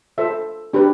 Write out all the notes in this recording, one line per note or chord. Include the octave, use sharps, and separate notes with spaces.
F4 A4 C5 E5
D4 G4 B4